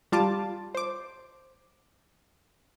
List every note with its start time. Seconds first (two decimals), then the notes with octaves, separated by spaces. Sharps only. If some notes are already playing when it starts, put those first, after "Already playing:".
0.12 G3 F4 A5 D6 A6
0.75 C5 D6